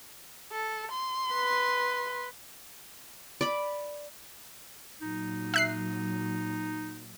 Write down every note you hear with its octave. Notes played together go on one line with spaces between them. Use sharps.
A4
C6
B4
D5 B5
A#2 F#3 D#4
E5 F#6 C7